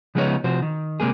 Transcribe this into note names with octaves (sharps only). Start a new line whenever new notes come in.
C#3 F3 G#3 B3 D#4 C#5
C3 F3 F#4 C5
D#3
C3 G#3 A#3 G#4